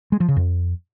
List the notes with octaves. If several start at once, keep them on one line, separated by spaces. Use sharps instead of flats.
G#3
F3
C#3
F2